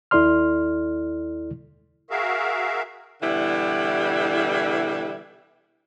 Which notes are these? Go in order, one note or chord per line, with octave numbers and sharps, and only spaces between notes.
D#2 E4 A4 D5 C6 F6
F#4 G#4 A#4 E5 F5
B2 D3 E3 G3 E4